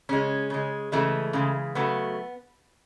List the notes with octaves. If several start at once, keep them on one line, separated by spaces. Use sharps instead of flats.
C#3 G#3 C#4
C#3 G#3
C#3 E3 G#3 A3
C#3 E3 G#3
C#3 F#3 A3 B3